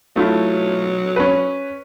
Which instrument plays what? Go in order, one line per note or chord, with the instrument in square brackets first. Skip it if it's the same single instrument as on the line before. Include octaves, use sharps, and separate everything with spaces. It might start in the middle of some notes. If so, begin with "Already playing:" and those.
[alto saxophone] F#3 [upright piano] A3 E4 F4
[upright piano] C#4 B4